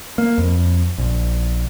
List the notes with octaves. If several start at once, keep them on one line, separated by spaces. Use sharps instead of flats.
A#3
F2
A#1